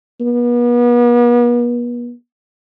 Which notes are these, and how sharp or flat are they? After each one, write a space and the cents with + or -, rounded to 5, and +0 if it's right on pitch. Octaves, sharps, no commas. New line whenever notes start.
B3 -40